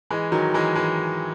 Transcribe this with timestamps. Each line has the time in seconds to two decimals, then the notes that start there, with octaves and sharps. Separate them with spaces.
0.11 E3 G#3
0.32 D#3 F#3
0.54 E3 G#3
0.75 E3 G#3